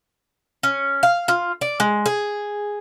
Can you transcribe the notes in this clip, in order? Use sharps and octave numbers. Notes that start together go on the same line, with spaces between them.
C#4
F5
F4
D5
G#3
G#4